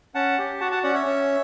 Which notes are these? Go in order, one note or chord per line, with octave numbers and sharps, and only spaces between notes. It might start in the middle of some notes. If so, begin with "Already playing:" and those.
C#4 F#5 A5
G4
F#4 F#5 A5
F#5 A5
C#4 D5 F#5
C#5 E5
C#4